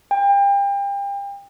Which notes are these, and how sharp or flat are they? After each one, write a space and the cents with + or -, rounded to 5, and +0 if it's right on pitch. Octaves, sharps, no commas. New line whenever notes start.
G5 +35